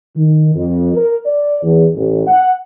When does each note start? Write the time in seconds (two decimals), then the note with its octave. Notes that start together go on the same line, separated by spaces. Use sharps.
0.16 D#3
0.55 F2
0.94 A#4
1.26 D5
1.63 E2
1.95 A1
2.27 F#5